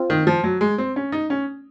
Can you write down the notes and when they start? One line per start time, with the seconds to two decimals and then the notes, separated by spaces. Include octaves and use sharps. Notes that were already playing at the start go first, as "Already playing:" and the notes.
Already playing: C4 F4
0.10 D#3
0.27 F3
0.44 F#3
0.61 G#3
0.78 C4
0.96 C#4
1.12 D#4
1.30 C#4